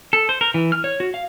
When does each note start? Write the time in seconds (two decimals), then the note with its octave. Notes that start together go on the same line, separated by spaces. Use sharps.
0.13 A4
0.29 C5
0.41 A#4
0.54 E3
0.72 F6
0.84 C#5
1.00 F#4
1.14 F5